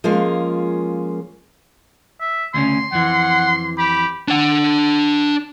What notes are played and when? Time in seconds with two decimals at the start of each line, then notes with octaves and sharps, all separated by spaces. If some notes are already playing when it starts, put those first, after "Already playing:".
0.04 F3 G#3 A#3 C#4 F4 G#4
2.20 E5
2.54 D2 C#3 C#4 C6
2.92 F2 E3 F#5
3.78 G4 B5
4.28 D4 F#5